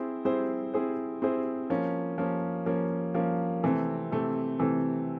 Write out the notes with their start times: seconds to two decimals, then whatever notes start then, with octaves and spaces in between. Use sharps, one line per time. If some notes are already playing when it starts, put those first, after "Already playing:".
Already playing: C4 E4 G#4 C5
0.25 C4 E4 G#4 C5
0.74 C4 E4 G#4 C5
1.22 C4 E4 G#4 C5
1.70 F3 A#3 C#4
2.18 F3 A#3 C#4
2.66 F3 A#3 C#4
3.14 F3 A#3 C#4
3.63 C3 E3 A3 C4
4.11 C3 E3 A3 C4
4.59 C3 E3 A3 C4